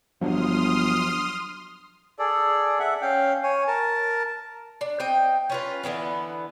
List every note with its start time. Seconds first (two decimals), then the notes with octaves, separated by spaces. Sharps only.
0.21 G1 F3 F#3 D4 C6 D#6 F6
2.19 G#4 A4 D5
2.79 E5 F#5
3.02 C#4 F5 G5
3.43 C#5 G#5
3.67 A#4 A5
4.81 D4
5.00 C4 D#5 G5
5.50 C#4 F4 B4
5.83 D3 E3 B3 C4